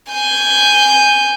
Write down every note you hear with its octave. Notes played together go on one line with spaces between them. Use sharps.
G#5 G6